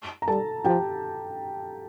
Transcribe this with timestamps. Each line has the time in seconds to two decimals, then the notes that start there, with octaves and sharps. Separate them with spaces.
0.22 A#5
0.28 G3 A4 A5
0.64 F3 G4 G5